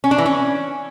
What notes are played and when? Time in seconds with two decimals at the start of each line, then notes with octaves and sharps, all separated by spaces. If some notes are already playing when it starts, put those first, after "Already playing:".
0.04 C#4
0.11 D4
0.18 E3
0.26 C#4